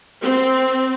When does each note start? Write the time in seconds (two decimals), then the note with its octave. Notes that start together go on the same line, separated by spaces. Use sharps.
0.22 C4